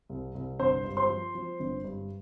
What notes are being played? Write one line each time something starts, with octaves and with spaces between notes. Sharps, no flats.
C2
C2
G1 C5 C6
G2
C5 C6
F3
F3
G1
G2